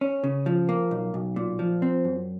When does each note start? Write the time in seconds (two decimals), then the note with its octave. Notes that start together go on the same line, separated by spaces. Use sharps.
0.01 C#4
0.24 C#3
0.46 F3
0.69 A#3
0.91 B1
1.14 B1
1.36 A#2
1.59 F3
1.82 C4
2.05 F#2